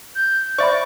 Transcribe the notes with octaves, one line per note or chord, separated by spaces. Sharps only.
G6
C5 D5 E5 B5 C#6 A6